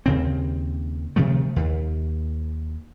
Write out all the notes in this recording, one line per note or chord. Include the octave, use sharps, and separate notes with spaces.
D#2 C#3 C4
C3 D#3 F3 A3
D#2